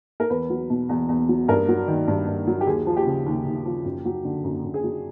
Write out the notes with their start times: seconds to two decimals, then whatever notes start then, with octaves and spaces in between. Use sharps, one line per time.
0.20 A#4
0.30 E2 B4
0.50 F#3
0.70 B2
0.89 E2
1.09 E2
1.29 F#3
1.48 G2 A#4
1.68 F#3
1.88 D#3
2.08 G2
2.27 G2
2.47 F#3
2.61 G4
2.67 D#2 G#4
2.87 F3
2.96 G4
3.06 C#3
3.26 D#2
3.46 D#2
3.66 F3
3.85 F#2
4.05 F#3
4.24 D3
4.44 F#2
4.64 F#2
4.74 G#4
4.84 F#3